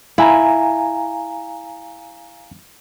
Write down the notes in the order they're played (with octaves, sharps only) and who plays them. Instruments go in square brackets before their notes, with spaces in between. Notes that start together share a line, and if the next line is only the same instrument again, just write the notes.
[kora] E4 [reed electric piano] F5 G#5 A#5